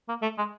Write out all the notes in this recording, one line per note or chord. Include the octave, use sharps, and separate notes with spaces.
A#3
A3
G#3